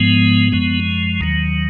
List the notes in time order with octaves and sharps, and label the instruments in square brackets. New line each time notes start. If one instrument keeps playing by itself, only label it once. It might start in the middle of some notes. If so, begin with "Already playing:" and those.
Already playing: [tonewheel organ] G#2 F3 G#3 B3
F#2 F3 G#3
D#2 D#3 F#3